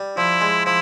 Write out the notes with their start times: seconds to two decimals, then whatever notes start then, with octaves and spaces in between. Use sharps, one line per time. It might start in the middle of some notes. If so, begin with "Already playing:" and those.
Already playing: G3
0.17 F3 E4
0.41 G#3
0.66 F3 E4